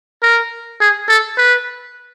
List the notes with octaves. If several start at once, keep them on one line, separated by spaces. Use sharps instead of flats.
A#4
G#4
A4
B4